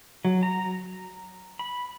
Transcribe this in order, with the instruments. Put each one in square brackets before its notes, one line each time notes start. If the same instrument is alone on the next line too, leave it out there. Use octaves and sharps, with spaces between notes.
[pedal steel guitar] F#3
A#5
B5